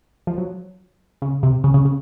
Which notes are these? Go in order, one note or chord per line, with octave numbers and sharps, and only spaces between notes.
F3
F#3
C#3
C3
C#3
C#3
C#3